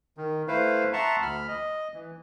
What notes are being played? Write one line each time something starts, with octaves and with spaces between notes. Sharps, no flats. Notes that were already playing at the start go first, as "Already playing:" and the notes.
D#3
A3 E4 B4 C5 F5
E5 F#5 A5 A#5 C6 C#6
D2 B5 F6
D#5
E3